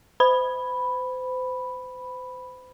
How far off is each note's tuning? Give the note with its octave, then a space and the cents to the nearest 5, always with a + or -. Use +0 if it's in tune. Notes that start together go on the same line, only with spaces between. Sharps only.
C5 -35 B5 +0